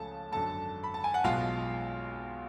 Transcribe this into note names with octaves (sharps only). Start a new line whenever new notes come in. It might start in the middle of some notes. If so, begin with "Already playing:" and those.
Already playing: C#2 C#3 F3 A3 C#4 A4 A5
G#1 F#2 D3 F#3 A4 A5
B5
A5
G#5
F#5
B1 B2 G#3 F4 F5